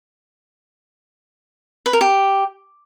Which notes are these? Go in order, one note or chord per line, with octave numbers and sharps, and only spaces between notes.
B4
A#4
G4